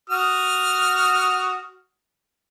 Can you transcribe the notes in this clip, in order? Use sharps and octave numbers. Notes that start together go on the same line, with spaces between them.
F#4 D#6 F6